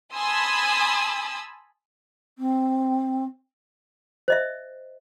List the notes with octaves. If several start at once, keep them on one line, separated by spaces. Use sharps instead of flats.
G#5 A5 B5 C6 D#6 E6
C4
C5 D#5 E5